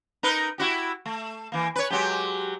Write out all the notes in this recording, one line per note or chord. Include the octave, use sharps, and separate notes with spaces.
D#4 A#4 B4
E4 F#4 G4
A3
E3 A#3
B4 C#5
F#3 G#3 G4